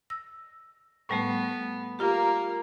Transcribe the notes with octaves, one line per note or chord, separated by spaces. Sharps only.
E6 A#6
A2 G3 A3 B3
A#3 F4 G4 A#4